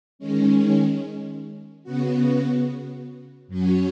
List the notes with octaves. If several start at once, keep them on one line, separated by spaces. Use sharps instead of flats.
D#3 G#3 C#4
C#3 B3 F#4
F#2 F#3 C#4 F#4